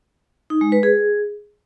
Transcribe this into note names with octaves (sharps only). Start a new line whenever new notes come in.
D#4
G#3
B4
G#4